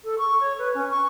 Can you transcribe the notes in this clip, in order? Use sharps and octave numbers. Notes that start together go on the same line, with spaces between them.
A4
C#6
C#5
B4
C#4
C#6